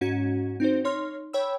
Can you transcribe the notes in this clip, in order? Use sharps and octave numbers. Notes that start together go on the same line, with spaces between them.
G#2 C#4 F#4 G#6
C4 D#4 F#4 C5
D#4 C#5 C6 F6
C#5 G5 B5 E6